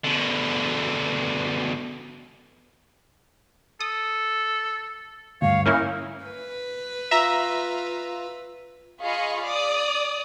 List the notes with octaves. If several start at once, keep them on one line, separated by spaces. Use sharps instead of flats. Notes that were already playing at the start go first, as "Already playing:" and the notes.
B2 D3
A4 D#6
D2 G2 C#5 F5
A#3 C#4 D#4 E4 F6
B4
F4 E5 A#5
F4 G#4 D#5 F5 B5 C#6
D5 D#6